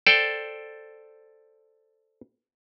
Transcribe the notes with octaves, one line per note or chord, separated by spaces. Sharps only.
A4 C5 D5 G5